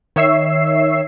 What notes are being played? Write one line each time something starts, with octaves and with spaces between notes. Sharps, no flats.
D#3 C#5 E5 E6 C7